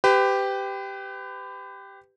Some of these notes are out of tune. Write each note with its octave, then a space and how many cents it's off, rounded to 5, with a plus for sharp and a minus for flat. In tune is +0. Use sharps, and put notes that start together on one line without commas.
G4 +0 B4 +35